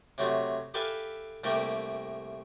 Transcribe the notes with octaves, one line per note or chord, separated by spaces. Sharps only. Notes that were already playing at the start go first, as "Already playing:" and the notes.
C3 F#3 A3
G4 A4 B4 E5 F5 G#5
C2 A3 A#3 G4